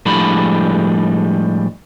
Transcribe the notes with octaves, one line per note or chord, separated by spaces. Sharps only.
A2 F3 G3 G#3 D4 B5